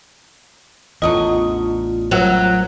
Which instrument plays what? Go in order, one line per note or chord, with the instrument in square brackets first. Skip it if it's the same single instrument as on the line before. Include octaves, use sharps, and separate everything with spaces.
[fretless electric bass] A1 E2 [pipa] D3 F#3 D#5 [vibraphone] F4
[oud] F#3 [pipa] A#4 E5 F#5